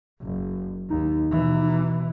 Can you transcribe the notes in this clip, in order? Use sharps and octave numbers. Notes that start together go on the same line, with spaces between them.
F#1
D#2 D#4
B2 E3